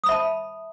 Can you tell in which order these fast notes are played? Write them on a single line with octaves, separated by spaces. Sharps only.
D#6 B5 E5 A5